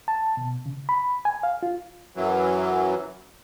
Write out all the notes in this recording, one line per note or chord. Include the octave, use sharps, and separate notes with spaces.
A5
B2
C#3
B5
G#5
F5
F4
F#2 E3 F#3